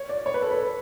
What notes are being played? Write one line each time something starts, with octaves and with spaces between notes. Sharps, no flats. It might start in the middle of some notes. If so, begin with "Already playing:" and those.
Already playing: C#5
D5
C#5
B4
A4
B4